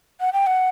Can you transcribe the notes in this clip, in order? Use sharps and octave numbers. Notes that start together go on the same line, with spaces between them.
F#5
G5
F#5